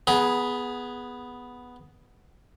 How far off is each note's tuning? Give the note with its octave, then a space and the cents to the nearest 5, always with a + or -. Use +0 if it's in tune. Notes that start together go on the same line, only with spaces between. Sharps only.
B3 +0 G#4 +0 A#5 +35